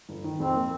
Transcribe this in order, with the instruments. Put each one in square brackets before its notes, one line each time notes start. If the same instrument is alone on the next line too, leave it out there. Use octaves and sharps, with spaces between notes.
[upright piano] G1
D#3
[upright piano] F2 [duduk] C4
[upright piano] A#3